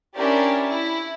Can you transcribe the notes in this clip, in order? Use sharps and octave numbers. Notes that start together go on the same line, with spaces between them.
C#4 D4 E4 G4 A#4 D5
E4